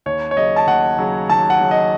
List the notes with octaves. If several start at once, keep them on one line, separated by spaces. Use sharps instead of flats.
D#2 C#5
C#5
C#3 F#3 D#5
A5
D#2 F#5
C#3 F#3
D#2 A5
F#5
C#3 F#3
D#5